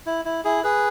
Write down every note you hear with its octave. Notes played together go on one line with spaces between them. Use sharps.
E4
E4
E4 G#4
G#4 B4